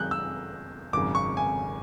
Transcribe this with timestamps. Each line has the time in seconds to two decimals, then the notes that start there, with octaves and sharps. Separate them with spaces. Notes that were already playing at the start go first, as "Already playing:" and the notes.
Already playing: F#2 D#3 G#3 F#6 G6
0.11 E6
0.93 G#1 F#2 C#3 D6
1.15 C#6
1.37 G#5